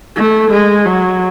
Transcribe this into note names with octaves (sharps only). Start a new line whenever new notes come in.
A3
G#3
F#3